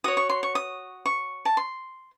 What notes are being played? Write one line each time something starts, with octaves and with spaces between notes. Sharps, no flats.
F#4 C#5 D#6
C#6
C6
C#6
D#6
C#6
A5
C6